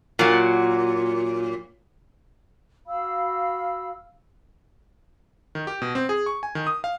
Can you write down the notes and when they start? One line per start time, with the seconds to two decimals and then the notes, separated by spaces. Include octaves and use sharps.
0.19 A#2 F#3
2.87 F#4 F5 B5 E6
5.55 D#3
5.67 G4
5.82 B2
5.95 C4
6.09 G#4
6.26 C#6
6.43 G#5
6.55 D#3
6.67 D#6
6.84 F5